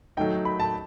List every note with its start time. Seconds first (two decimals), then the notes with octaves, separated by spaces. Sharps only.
0.17 F#3 A3 D#4 G5
0.45 B5
0.60 A5